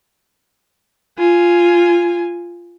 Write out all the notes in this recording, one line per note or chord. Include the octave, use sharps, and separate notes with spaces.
F4 G#5